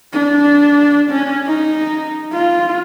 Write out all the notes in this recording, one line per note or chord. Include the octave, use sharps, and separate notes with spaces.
D4
C#4
D#4
F4